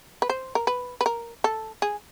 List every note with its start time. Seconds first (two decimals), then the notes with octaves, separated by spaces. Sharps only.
0.22 B4
0.30 C5
0.55 A#4
0.67 B4
1.01 B4
1.06 A#4
1.44 A4
1.82 G#4